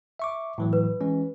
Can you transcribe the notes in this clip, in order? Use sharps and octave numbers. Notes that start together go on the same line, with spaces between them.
E5 C#6 D6
A2 E3 F#3
B4
E3 G#3 C#4